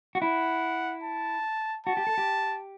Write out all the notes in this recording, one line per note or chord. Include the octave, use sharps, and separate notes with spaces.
F#4
E4 F#5
A5
F#4 A5
G4
A4
G4